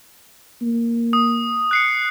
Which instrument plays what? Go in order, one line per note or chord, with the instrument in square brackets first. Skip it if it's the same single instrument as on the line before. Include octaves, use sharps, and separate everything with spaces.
[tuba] A#3
[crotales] D#6
F#6 C7 C#7